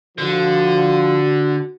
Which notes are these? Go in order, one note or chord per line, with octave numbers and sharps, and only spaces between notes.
D3 F3 F#4